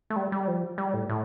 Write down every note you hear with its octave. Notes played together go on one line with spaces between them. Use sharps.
A3
G3
G3
F3
G3
A2
A2